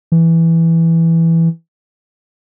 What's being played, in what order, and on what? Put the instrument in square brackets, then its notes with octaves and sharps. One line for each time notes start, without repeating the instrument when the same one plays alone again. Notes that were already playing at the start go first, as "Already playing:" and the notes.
[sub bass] E3